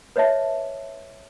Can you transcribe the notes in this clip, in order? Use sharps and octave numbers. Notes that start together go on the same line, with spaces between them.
B4 C#5 D#5 E5 A5